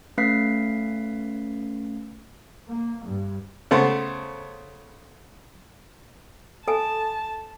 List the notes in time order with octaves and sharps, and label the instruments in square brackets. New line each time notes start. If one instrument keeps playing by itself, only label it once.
[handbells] A3 C#4 B4 F5 B6 C7
[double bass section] A#3
G2
[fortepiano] C#3 A3 B3 A4 C5
[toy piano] A4 G#5 [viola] A5